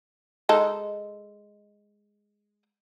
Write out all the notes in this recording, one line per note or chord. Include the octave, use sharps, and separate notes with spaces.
G#3 D#4 A4